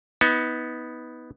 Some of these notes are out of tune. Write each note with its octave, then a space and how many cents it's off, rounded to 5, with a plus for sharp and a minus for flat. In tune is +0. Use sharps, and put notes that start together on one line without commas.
B3 +0 D#4 +35